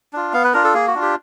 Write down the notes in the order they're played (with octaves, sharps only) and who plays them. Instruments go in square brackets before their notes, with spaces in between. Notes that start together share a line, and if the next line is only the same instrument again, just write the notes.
[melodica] D4 F4
B3 F5
B4
D4 F4 A#4
A4
A#3 G#4
F#4
D4 F4
G4